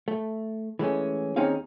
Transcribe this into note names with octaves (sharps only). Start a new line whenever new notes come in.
A3
E3 G#3 A3 C#4
D#2 C4 C#4 D#4 G#4 F5